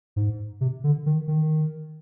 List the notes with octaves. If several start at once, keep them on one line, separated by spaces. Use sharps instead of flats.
G#2
C3
D3
D#3
D#3